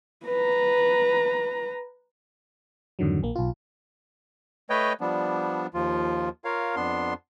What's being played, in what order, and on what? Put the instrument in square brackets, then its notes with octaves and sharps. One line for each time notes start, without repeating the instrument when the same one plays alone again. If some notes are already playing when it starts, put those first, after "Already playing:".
[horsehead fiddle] B4 A#5
[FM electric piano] F2 G#2 D3 D#3 F#3
A#1 A#3
B1 F4
[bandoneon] A3 B4 C#5 D#5 G5
F3 G3 B3 D4
D#2 F3 F4
F4 A#4 C#5 F5
F2 B3 D4 C6